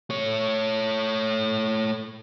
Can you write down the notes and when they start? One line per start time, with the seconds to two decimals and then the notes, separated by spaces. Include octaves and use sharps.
0.10 A3 C#5